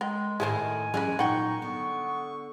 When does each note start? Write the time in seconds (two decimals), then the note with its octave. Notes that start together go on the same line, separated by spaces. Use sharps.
0.01 G#3 A#4 G5
0.40 A2 D#3 E4 G#4 A4 C5 G#5
0.94 E3 F#3 G#3 C#4 G#4 A#4
1.19 A#2 F#3 D#4 F#5 G5 C#6
1.62 D3 B3